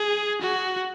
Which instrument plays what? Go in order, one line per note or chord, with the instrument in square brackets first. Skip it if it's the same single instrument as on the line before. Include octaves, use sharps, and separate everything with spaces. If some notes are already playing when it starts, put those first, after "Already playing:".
Already playing: [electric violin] G#4
F#4